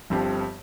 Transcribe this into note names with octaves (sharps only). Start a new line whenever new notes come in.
G1 G2 F3 C4 G4